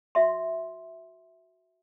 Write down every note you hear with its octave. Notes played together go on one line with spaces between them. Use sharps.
F#4 E5 C6